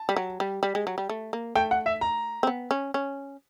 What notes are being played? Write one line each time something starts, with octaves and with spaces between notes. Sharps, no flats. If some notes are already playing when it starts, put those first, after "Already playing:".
Already playing: A5
G3
F#3
G3
G3
G#3
F#3
G3
A3
A#3
A3 G5
F#5
E5
A#5
C4
B3
C#4
C#4